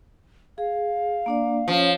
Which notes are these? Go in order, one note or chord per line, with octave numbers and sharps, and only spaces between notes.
G#4 F5
A#3 D4 D5
F3 C#4 C#5
C#5